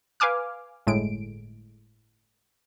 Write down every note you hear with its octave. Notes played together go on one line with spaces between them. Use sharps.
B4 F5 G#5 D6 F6
G1 A2 G#3 D7